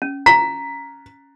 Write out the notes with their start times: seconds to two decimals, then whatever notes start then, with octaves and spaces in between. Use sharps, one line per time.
0.02 C#4
0.26 A#5 B6